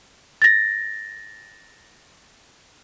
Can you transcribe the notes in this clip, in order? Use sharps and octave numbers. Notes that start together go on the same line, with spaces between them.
A6 A#6